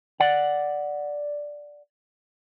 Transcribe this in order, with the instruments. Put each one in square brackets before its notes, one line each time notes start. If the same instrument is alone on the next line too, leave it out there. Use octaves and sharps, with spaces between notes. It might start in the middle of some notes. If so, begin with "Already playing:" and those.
[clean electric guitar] D5 F#5